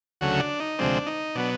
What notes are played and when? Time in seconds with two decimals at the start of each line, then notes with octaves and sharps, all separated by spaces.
0.21 D2 C#3 F#3 A3 F#4
0.40 D4
0.60 D#4
0.79 D2 C3 F3 G#3 C4 D4
1.06 D#4
1.35 B2 F#3 B3 D4